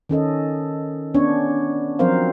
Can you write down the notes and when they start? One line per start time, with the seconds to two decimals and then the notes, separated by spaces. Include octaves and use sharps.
0.09 D#3 C#4 A4 D#5
1.14 B3 C#4 D4 C#5
1.99 F3 F#3 C4 A#4 C5 F5